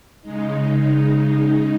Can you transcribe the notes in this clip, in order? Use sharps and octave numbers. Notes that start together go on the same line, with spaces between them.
C#3 G#3 D#4